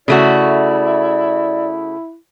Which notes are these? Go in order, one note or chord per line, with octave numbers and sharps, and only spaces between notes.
C#3 A3 E4 F#4 D5